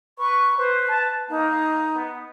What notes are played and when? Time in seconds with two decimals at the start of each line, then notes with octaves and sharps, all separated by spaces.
0.19 B4 C#6
0.58 B4 C5
0.88 A5
1.30 A#3 D#4
1.95 B3